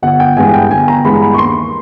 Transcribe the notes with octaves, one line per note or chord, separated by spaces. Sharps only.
G1 F#5
G5
G2 E3 G#3 B3 G#5
G5
G1 G#5
A#5
G2 E3 G#3 B3 B5
B5
C#6
D#2 C6